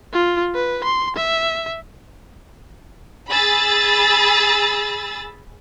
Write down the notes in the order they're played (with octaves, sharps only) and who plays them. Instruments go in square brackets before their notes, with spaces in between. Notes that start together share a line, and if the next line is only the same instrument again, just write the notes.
[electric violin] F4
B4
C6
E5
[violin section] G#4 B5 E6 A6